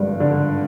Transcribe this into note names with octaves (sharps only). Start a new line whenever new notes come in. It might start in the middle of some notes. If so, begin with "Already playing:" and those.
Already playing: G#1 G2 D3 F3
D3